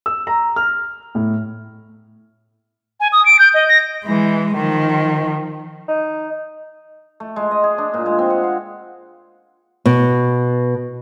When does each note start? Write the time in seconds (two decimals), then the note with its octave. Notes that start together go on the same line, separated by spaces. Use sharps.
0.06 E6
0.27 A#5
0.56 F6
1.15 A2
3.00 G#5
3.12 D#6
3.25 D7
3.39 G6
3.54 D#5
3.69 A#6
4.05 E3 G#3
4.56 D#3 F3
5.88 D#4
7.20 A3
7.36 G#3
7.51 D#5
7.64 G#4
7.78 D4
7.94 A#2
8.06 G#3
8.19 C4
8.30 F#5
8.44 F5
9.86 B2